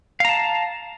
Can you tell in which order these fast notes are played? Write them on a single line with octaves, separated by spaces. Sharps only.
F5 A#5 A5